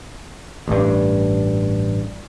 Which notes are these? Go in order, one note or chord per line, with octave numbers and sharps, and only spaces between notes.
A1 G2